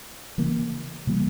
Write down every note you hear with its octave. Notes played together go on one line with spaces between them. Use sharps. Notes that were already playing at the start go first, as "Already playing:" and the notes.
C#3 E3 A#3
C3 E3 G3 A#3